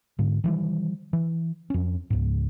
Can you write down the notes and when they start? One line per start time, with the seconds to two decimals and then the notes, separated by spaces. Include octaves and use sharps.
0.19 G#2 D3
0.44 D#3 E3 G3
1.13 E3
1.70 F2 C#4
2.10 C#2 G#2